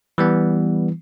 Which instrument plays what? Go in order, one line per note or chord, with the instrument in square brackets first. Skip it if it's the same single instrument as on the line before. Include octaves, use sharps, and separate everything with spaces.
[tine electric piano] E3 G3 B3